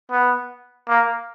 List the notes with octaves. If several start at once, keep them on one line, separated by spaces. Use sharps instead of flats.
B3
A#3